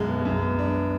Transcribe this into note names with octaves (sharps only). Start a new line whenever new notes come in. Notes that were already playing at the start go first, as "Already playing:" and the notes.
Already playing: B1 F#2 G#3
B3
F#2
B3
D4